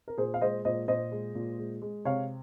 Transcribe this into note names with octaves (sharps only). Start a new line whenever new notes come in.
A#4
A#2 G#4 C5
F5
G#3 C5 D#5
A#2 C5 D#5
A#2 C5 D#5
G#3
A#2
G#3
G#3
C3 C#5 F5